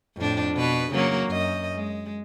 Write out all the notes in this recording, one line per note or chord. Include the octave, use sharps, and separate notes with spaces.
F2 A2 D4
B2 B4
C#3 F#3 A#3
F#2 D#5
G#3